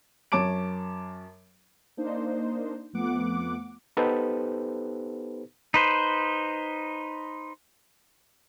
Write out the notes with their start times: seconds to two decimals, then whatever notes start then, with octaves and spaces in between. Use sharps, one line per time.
0.32 F#2 C#5 A5 D6 D7
1.97 A#3 D4 D#4 C5
2.93 F2 F3 A3 B3 F#5 D6
3.97 B3 D#4 G4 A4 B4 C5
5.74 D#4 B4 C5